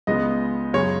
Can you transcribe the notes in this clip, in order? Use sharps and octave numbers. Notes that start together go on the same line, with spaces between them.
C#2 C#3 G#3 B3 D#5
F#2 C#3 G#3 C#5